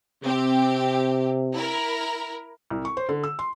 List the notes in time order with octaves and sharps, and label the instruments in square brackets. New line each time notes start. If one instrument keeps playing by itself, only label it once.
[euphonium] C3 [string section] C4 G4
[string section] E4 A#4
[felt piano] C2
C#6
C5
D3
E6
C6